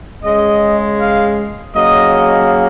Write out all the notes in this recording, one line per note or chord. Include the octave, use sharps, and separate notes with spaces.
C#3 G#3 D#5
F5
C#3 F#3 A#3 D#5